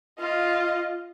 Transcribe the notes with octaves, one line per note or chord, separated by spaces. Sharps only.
F4 D#5